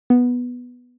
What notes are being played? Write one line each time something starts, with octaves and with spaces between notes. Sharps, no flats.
B3